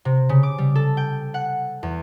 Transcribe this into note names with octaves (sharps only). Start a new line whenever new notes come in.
C3
C#3
D6
G3
A4
G5
F#5
E2